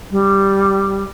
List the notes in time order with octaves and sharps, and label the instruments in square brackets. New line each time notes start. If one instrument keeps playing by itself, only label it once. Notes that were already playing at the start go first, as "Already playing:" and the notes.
[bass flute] G3